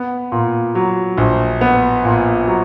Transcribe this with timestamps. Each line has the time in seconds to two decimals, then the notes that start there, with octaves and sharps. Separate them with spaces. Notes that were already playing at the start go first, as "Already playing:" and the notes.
Already playing: B3
0.32 A#2
0.75 F#3
1.18 A#1
1.61 B3
2.05 A#2
2.47 F#3